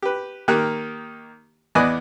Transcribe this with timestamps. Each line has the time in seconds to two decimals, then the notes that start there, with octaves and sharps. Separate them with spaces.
0.03 G4 B4
0.48 D#3 A#3 G4 F#6
1.75 E2 B3 D5 D#5 G#5 F#6